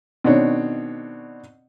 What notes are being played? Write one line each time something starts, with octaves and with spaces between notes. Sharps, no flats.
B2 D#3 C4 D4 C#5